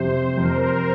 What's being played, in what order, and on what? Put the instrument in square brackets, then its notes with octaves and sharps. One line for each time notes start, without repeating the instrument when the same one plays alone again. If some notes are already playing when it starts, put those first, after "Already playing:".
Already playing: [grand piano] F2 C3 [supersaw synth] C5
[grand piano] F2 [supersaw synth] A#4